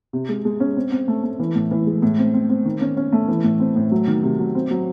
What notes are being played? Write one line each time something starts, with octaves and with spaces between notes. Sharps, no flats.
C3
G#3
G#3
C#4
C4
C4
A3
A3
E3
A2
E3
G#3
A2
C4
C4
C4
D#3
C#4
C#4
A3
E3
A2
C4
A2
F#3
D#3
C3
F#3
C4
F#3